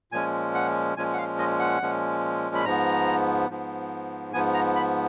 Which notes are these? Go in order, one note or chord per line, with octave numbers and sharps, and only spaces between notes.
A#2 F3 G#3 C#4 G#5
F#5
A#2 F3 G#3 C#4 G#5
F#5
F5
D#5
F#5
A#2 F3 G#3 C#4
B5
G#2 F3 B3 A#5
G#2 F3 B3
G#2 F3 B3 G#5
A#5
B5